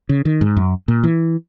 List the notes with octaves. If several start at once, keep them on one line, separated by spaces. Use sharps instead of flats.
C#3
D#3
G#2
F#2
A#2
E3